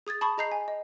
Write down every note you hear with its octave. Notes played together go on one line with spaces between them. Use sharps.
G#4 D#6 G#6 A6
A5 B5 C#6 D#6
G#4 D#5 A#5 G6 C7
G#5
D#5